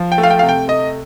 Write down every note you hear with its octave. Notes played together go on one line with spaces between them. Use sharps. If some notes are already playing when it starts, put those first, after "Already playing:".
Already playing: F3
G5
A3
F5
G5
C3 F5
G5
A3 D#5